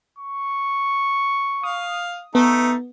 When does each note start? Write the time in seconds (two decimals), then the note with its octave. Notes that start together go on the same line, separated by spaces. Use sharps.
0.18 C#6
1.63 F5 D#6
2.35 A3 B3 D#4